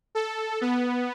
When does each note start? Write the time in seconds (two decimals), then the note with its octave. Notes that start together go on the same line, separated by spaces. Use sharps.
0.15 A4
0.61 B3